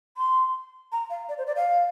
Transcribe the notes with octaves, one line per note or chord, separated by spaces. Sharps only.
C6
A#5
F5
D5
C5
D5
F5